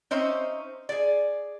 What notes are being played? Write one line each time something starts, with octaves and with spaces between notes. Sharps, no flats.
C4 C#4 D#4 C5 E5
G#4 D5